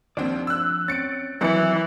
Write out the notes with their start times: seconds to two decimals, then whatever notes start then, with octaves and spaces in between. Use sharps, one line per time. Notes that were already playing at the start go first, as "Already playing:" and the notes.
0.17 D#2 F3 C4 D4 D5
0.47 E6 F#6
0.88 C4 C#4 A6 C#7 D7
1.41 D#3 E3 F#3 C4 F#6 C#7